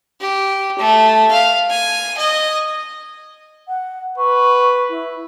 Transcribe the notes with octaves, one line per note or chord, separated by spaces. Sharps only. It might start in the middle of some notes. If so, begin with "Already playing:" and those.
G4
A3
F5
G#5
D#5
F#5
B4 C#6
E4